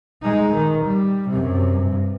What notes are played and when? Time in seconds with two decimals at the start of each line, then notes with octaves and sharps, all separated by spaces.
0.22 G#3 D#4
0.54 D#3
0.85 G3
1.30 F#2 C3
1.87 G2